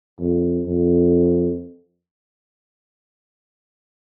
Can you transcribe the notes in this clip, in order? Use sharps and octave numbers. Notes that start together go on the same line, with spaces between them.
F2
F2